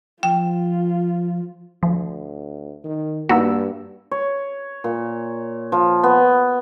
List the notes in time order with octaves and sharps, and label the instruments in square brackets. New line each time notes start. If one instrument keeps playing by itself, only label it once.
[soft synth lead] F3 [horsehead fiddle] F4 [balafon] G5
[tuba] D2 [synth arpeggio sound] F3
[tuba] D#3
[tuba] G2 [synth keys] A#3 E6 [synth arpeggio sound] B3 D#4 F#4
[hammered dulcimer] C#5
A#2
F3
B3